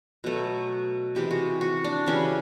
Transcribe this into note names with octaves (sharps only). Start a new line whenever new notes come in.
B2 F#3 A3
C3 E3 G#3 B3 G4
F#4
F#4
D4
C#3 E3 G3 C#4